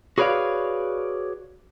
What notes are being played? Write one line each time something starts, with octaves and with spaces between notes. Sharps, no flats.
F#4 G#4 B4 C#5 D5 F5